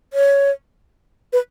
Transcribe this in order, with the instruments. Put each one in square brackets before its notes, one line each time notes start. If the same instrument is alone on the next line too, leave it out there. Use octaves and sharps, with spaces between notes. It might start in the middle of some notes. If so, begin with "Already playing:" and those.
[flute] C#5
B4